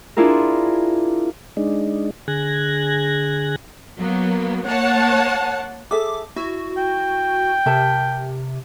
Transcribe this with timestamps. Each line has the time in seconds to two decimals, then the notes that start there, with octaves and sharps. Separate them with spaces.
0.17 D4 E4 F4 G#4 A#4
1.57 G#3 D4 D#4
2.28 D3 G#4 F#6 G#6 A#6
3.99 F#3 A#3 B3
4.68 A#3 C#5 F#5 A5
5.91 G#4 A4 E5 D6
6.36 E4 F#4
6.77 G5
7.66 C3 A#4 E5 A5